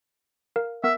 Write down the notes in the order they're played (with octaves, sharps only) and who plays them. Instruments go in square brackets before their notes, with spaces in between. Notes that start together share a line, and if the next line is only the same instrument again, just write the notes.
[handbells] A#4 F5
[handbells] B3 A#4 [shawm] E5